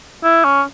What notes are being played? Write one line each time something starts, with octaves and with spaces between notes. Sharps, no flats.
E4
C#4